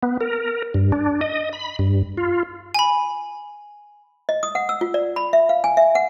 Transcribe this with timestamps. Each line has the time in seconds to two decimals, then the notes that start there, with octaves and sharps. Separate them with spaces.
0.03 B3
0.21 A#4
0.74 G2
0.92 D4
1.21 D#5
1.53 B5
1.79 G2
2.17 F4
2.75 G#5 B5
4.29 D#5
4.43 D#6
4.55 F#5
4.69 E6
4.81 F4
4.94 D5
5.16 B5
5.33 E5
5.49 F5
5.64 G#5
5.77 E5
5.95 F#5